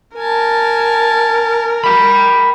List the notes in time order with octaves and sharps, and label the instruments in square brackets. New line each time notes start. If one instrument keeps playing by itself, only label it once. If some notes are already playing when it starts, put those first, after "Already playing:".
[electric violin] A#4 [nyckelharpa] G#5 A5
[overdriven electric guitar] G5 B5